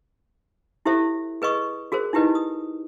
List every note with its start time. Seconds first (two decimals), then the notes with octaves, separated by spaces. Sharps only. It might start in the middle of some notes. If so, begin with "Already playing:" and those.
0.85 E4 G4 A4 C5 E5
1.42 G#4 B4 D#5 C#6 D#6
1.92 F#4 G#4 A#4 C5
2.13 D#4 E4 G4 B4 D#5
2.35 D#6